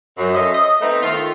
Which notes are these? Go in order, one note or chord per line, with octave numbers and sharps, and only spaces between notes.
F#2
F#3 C#4 A4 C5 D#5 E5
D#5
A3 B3 C4 D#4
D#3 A3 F4